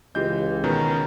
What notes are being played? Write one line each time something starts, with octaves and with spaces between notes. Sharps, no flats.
C#2 E3 F4 G4 D#5 G6
B2 D#3 C#4 B4 A#5